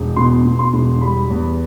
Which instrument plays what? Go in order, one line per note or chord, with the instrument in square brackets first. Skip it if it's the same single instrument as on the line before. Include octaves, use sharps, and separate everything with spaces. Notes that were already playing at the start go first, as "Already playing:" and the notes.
Already playing: [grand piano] E1
B2 C6
B2
C6
E1
G3 B5
E2